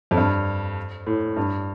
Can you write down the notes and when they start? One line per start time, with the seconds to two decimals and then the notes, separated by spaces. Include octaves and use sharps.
0.11 F2
0.17 G2
1.07 A2
1.36 G2